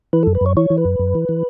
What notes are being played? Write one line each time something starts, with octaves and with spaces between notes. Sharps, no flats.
E3 B4
F#2 A4
B4
F#2 C#5
E3 C#5
E3
B4
F#2
F#2
E3
E3